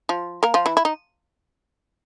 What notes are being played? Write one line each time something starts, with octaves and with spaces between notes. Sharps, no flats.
F3 F4
A#3 A#4
F3 F4
E3 E4
E4
D#4